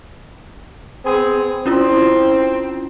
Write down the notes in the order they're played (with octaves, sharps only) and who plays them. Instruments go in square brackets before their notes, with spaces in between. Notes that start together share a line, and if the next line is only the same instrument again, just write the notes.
[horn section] B3 C4 G#4
[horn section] C4 [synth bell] C#4 E4 F4